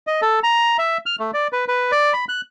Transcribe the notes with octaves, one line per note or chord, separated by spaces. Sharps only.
D#5
A4
A#5
E5
F6
A3
D5
B4
B4
D5
B5
F#6